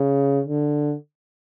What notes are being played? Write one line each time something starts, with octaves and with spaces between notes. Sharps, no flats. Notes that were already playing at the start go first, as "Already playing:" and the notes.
Already playing: C#3
D3